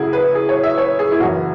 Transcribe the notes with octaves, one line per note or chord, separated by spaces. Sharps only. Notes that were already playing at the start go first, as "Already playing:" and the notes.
Already playing: F#1 F#2 C#3 E4 F#4 G#4
B4
G#4
C#5
E5
C#5
G#4
E4
F#1 F#2 E3 F#4